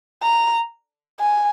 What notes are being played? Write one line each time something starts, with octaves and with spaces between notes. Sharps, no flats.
A#5
G#5